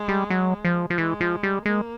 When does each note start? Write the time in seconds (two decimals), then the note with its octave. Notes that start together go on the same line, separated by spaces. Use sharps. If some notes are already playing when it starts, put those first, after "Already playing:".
Already playing: G#3
0.08 G3
0.30 F#3
0.65 F3
0.90 F3
0.98 E3 G#3
1.21 F3
1.43 G3
1.65 G#3 A#3